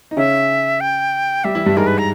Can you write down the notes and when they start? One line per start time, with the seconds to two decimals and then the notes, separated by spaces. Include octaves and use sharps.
0.11 D#4
0.17 C#3 C#4 E5
0.81 G5
1.44 G3 G4 E5
1.55 E3 E4
1.66 G2 G3
1.77 G#2 G#3 A#4
1.87 B4
1.98 A#5